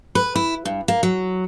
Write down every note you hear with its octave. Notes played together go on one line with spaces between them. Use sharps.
B4
E4
G2
A#3
F#3